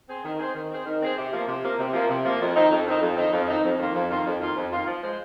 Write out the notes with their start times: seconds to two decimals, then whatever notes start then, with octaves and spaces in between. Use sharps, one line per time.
0.09 C4 G#4 C5
0.24 D#3
0.40 C4 G#4 C5
0.54 D#3
0.70 C4 G#4 C5
0.86 D#3
1.01 C4 G#4 C5
1.16 C3
1.32 F3 A#3
1.47 C3
1.63 F3 A#3
1.78 C3
1.93 F3 A#3
2.09 C3
2.24 F3 A#3
2.40 F2
2.55 D#3 C4 D#4
2.70 F2
2.86 D#3 C4 D#4
3.01 F2
3.16 D#3 C4 D#4
3.33 F2
3.48 D#3 C4 D#4
3.63 F2
3.78 D#3 A#3 F4
3.95 F2
4.10 D#3 A#3 F4
4.25 F2
4.40 D#3 A#3 F4
4.56 F2
4.70 D#3 A#3 F4
4.86 F3
5.02 G#3 F4 C5